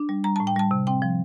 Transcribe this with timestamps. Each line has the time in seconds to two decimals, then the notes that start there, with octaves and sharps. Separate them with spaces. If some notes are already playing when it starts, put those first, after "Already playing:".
Already playing: D4
0.09 G3
0.24 G3 A#5
0.36 A2 A5
0.47 G5
0.56 G3 A5
0.71 C3
0.87 C4 G5
1.02 F3